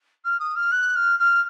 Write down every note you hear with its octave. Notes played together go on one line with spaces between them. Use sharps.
F6
D#6
F6
F#6
F6
F6